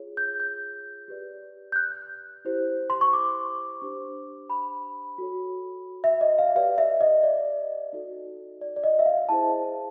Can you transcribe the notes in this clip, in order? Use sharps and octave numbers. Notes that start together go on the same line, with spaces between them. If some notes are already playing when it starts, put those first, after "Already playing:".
Already playing: F4 G#4 C#5
G6
G6
G4 B4 D5
G6
F#6
E4 G4 C5
C6
C#6
D6
D4 G4 C5
B5
F#4 A4 C#5
E5
D#5
F5
G4 B4 D5 F5
E5
D#5
D5
D#4 F#4 A4 D5
D5
D5
D#5
E5
F5
E4 G#4 C5 A5